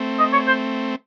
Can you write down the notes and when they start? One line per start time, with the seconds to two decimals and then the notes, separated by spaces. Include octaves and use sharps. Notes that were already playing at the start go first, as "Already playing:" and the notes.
Already playing: A3 C4
0.19 D#5
0.33 C#5
0.47 C5